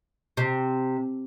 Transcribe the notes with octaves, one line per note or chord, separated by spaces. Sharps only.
C3